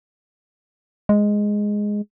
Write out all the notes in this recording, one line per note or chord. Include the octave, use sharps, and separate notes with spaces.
G#3